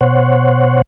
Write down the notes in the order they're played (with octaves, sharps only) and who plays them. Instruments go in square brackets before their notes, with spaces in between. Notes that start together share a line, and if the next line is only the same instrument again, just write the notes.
[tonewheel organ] B2 C5 C#5 F#5